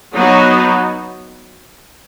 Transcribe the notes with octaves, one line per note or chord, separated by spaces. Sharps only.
F#3 B3 D#4 F#4